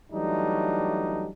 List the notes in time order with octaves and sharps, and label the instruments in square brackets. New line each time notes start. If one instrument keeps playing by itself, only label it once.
[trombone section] E3 F#3 G3 A3 D4 D#4